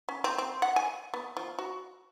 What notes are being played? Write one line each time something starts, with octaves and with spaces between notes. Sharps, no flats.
C#4
C4
C4
F#5
G#5
B3
F3
F#4